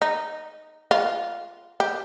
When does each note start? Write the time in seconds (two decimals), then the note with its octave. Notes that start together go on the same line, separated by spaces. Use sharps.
0.02 D#4
0.91 F4
1.80 G4